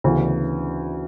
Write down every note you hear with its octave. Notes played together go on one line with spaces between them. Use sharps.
D2 C#3 E3 B3 D4